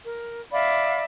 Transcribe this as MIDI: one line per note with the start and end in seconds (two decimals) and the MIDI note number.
0.06 0.41 70
0.52 1.04 74
0.52 1.04 76
0.52 1.04 77
0.52 1.04 83